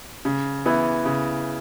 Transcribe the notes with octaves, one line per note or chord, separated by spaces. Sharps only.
C#3
E3 B3 E4
C#3